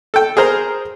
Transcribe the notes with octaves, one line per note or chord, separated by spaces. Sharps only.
A4 G5
G#4 A#4 C5 A#5